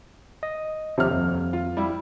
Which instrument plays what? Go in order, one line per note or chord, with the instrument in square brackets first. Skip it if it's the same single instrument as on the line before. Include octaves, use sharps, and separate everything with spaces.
[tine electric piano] D#5
[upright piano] D#1 C#5 F6 [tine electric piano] C3 F3
[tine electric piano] F2
[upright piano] F4
G3 E4